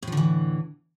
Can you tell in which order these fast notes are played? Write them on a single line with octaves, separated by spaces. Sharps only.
A2 F3 D3 E3